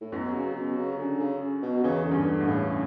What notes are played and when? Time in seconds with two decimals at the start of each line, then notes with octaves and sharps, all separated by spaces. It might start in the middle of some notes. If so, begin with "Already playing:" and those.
0.01 A2
0.12 F#2 B2 F#3
0.34 C#3
0.55 B2
0.77 C#3
0.98 D3
1.20 C#3
1.62 B2
1.83 E2 C#3 E3
2.05 D3
2.12 G2
2.26 D3
2.40 A1 A2
2.48 C#3